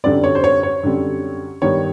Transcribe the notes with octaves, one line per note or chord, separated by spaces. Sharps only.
F#2 D3 G3 C4 D5
C#5
C5
C#5
C#5
F#2 D3 G3 C4
G2 D#3 G3 B3 C#5